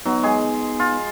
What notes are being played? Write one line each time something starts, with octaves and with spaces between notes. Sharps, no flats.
F#3 B3 D#4
G#3 G#4
F4